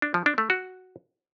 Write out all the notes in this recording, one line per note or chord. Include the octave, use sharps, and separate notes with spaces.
D4
F3
D4
A3
F#4